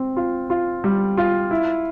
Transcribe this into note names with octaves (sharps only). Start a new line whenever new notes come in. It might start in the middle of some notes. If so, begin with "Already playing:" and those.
Already playing: C4
F4
F4
G3
F4
E4